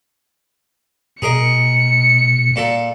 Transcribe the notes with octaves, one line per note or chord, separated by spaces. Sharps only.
B2 G#4 A#4 D#5 C#7
A#2 A4